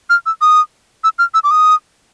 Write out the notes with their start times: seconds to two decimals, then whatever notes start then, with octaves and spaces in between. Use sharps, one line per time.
0.10 F6
0.26 E6
0.41 D#6
1.04 E6
1.19 F6
1.34 E6
1.44 D6
1.51 D#6